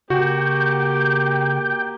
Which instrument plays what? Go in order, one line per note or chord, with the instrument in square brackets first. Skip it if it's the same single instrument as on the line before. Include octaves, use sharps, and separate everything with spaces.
[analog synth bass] C#3 [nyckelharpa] A#3 G4 [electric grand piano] F#4 [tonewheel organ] G5